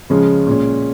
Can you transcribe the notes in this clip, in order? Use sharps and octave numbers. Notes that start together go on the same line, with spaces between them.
C#3 F3 G#3 C#4
A#2 G#3 C#4